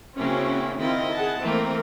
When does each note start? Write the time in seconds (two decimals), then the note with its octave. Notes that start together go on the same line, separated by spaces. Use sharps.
0.17 C#3 A#3 C4 C#4 E4 F#4
0.78 D#3 C4 E4 F4 D#5
1.13 G#4 F#5 A5
1.42 E3 A3 A#3 C4 A#4